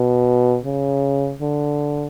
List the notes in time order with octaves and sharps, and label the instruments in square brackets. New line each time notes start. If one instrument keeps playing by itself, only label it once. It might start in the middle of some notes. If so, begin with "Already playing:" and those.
Already playing: [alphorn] B2
C#3
D3